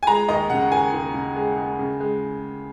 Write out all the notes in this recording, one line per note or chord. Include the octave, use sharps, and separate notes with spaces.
G#5
G#3 A#5
D#2 D#5
C#3 F#5
D#2 G#5
D#2
C#3
G#3
G#3
C#3
G#3